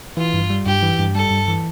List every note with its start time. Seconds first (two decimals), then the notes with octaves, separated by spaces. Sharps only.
0.17 E3 F4
0.34 G2
0.50 G3
0.66 G2 G4
0.82 E3
0.99 G2
1.15 G3 A4
1.31 G2
1.48 E3